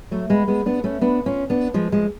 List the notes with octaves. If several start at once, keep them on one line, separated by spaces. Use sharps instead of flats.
F#3 A3
G#3 B3
G#3 B3
B3 D4
A3 C#4
B3 D4
C#4 F4
B3 D4
F3 G#3
F3 G#3